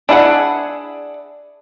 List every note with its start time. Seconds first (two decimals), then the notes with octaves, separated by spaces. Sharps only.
0.09 D4 E4 G#4 F#5